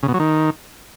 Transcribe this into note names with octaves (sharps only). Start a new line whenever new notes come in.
C#3
B2
F#3
D#3